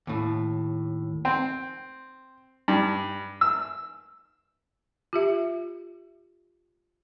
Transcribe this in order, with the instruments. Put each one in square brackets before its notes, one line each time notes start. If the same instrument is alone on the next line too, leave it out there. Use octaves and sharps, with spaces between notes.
[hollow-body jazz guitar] D#2 A2
[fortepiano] C4
G2
E6
[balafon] F4 G4 E5